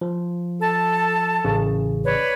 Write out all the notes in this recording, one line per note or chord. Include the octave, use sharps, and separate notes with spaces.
F3
A4 A5
A1 C#3
B4 C#5 D5